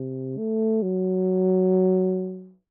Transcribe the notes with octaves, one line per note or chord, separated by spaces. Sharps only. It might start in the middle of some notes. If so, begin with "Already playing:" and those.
Already playing: C3
A3
F#3